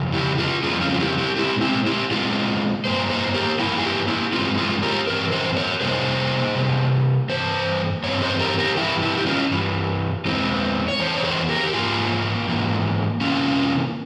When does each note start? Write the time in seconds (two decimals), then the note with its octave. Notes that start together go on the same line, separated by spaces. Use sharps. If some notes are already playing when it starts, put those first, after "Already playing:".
Already playing: F2 C#3
0.13 E4 G4
0.38 F4 G#4
0.63 F2 C#3 G3 C4 F4 G#4
0.81 C#4 F4
0.94 F4
1.00 E4 G4
1.18 E4 G4
1.37 A#2 G#3 C4 E4 G4
1.61 C4 E4
1.86 E4 G4
2.11 A#2 G#3 C4 F4 G#4
2.85 G2 G3 A#3 C5
3.10 G#4 C5
3.34 G4 A#4
3.59 G2 G3 A#3 E4 G4
3.77 G#4
3.84 E4 G4
4.08 E4 G4
4.33 G2 E3 G#3 C4 F4 G#4
4.58 F4 G#4
4.83 G4 A#4
5.07 G2 E3 C4 A#4
5.32 G#4 C5
5.56 A#4 C#5
5.81 C3 G3 A#3 G#4 C5
6.55 C3 G3 A#3
7.29 G2 E3 C5
8.03 G2 E3 C4 C#5
8.22 G#4 C5
8.40 G4 A#4
8.58 G4 A#4
8.77 G2 E3 G3 E4 G4
9.02 E4 G4
9.18 G4
9.26 C#4 F4
9.51 G2 E3 G3
10.25 E2 E3 G#3 C4
10.88 C#5
10.99 E2 E3 C5
11.17 C#5
11.23 G#4 C5
11.49 G4 A#4
11.63 G4
11.73 G#2 E3 A#3 F4 G#4
12.47 G#2 E3 A#3
13.21 C3 E3 A#3 C#4 F4